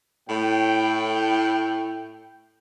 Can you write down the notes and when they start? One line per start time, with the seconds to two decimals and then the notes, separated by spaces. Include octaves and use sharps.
0.28 A2 G5